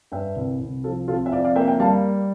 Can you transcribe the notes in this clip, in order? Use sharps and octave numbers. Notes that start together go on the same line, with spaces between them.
G2 E5 G5
C2
C2
F3 F4 A4
C3 F4 A4
E5
F2 D5 F5
D5 F5
A#3 E5 G5
E5 G5
G3 F5 A5